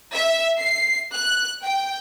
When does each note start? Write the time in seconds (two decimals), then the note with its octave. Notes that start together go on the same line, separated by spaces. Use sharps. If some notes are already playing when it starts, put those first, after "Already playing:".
0.13 E5
0.59 C7
1.13 F#6
1.63 G5